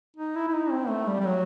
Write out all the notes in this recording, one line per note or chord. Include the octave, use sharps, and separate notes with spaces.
D#4
E4
E4
D#4
C4
A3
G3
G3
F#3